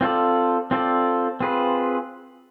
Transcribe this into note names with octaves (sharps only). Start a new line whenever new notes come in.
C4 F4 A4 D5
C4 F4 A4 D5
C4 F4 G#4 B4